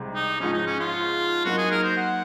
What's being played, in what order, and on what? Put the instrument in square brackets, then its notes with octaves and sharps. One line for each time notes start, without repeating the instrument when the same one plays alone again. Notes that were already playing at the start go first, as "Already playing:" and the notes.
Already playing: [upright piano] C2 C3 G#3
[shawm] D#4
[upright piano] G#2 F3 G#3 [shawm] C#4
[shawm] D#4
C#4
F4
[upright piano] F#3 A#3 D#4 [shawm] F#4
[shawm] G#4
A#4
C5
F#5